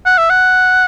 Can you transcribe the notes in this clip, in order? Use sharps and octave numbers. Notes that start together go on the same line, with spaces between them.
F#5
E5
F#5